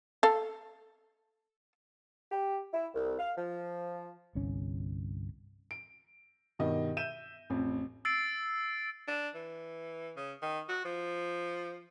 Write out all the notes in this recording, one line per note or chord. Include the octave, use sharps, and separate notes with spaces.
A4 F5
G4
E4
C2
F5
F3
G1 C2 C#4
D7
G2 B2 D#3 D#5
E5 G6 D#7 E7
A1 F2
E6 A6 C7 D7
D4
E3
C#3
D#3
F#4
F3